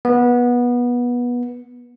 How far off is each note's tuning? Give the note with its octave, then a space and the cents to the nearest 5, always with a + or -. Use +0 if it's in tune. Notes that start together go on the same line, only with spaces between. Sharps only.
B3 -20